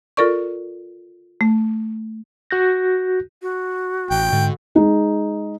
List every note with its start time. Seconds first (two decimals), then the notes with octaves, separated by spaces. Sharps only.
0.17 F4 A4 A#4 D5 C#6
1.41 A3
2.51 F#4 F#6 G6 A#6
3.42 F#4
4.11 A1 G5
4.32 G#2 D3
4.75 G#3 D#4 G#4